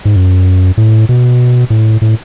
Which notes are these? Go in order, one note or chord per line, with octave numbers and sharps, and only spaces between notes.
G#2
F#2
A2
B2
A2
A2